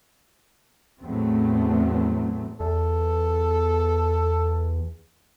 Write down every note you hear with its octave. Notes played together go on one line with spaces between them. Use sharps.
E2 A2 F#3 A3 C4
E2 A4